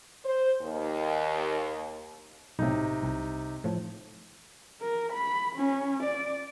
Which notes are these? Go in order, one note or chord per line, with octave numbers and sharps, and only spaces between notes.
C5
D#2
B1 A2 C3 D#4
C2
A2 F3 A3
A#4
B5
C#4
D5